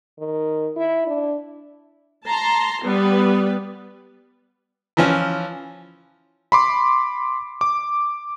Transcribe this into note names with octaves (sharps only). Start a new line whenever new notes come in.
D#3
E4
D4
A5 A#5 C6
G3 B3 B4
E3 F3 C#4
B5 C6 D6
D6